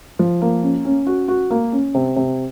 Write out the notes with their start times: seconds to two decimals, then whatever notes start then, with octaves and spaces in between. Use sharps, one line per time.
0.19 F3
0.42 A#3
0.63 C#4
0.85 C#4
1.07 F#4
1.28 F#4
1.50 A#3
1.72 C#4
1.94 C3
2.16 C3